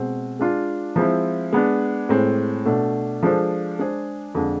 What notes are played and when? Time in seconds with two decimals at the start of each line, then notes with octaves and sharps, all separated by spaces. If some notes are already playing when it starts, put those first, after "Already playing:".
Already playing: B2 G#3 C4
0.39 G#3 D4 F4
0.96 F3 G#3 C4 E4
1.53 G#3 B3 D4
2.09 A2 G#3 C4
2.66 B2 A3 D4
3.23 F3 G#3 D4 A4 C5
3.79 G#3 D4 G#4 C5
4.35 F2 D3 G#3 D4